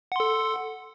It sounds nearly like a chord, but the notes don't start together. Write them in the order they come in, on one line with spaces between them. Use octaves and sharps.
F#5 C6 A4